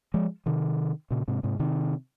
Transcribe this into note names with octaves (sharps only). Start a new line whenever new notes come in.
F3 G#3
C3 D#3
A#2 C#3
G#2 C3
G#2 C3
C3 D#3